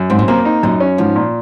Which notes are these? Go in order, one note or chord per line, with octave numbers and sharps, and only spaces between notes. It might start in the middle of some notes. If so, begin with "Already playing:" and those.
Already playing: F#2
G#2 C4
A#2
C3 A#3
D#4
F#2 A#2
C#4
G#2 F3
A#2